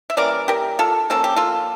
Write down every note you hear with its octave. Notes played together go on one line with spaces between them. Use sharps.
E5
E3 G3 A#3 C#4 A#4 D5
G4 A#4
F4 A4
F3 A#3 C#4 A4
G4
F4 A4